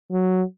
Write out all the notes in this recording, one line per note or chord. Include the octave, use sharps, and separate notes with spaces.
F#3